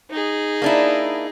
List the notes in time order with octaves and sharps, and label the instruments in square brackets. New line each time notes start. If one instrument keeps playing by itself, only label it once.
[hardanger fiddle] D#4 G#4
[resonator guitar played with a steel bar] A#3 D4 E4